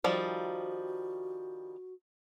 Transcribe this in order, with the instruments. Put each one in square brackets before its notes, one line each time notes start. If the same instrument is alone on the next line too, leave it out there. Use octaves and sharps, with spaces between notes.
[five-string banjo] D#3 F3 G3 [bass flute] F#4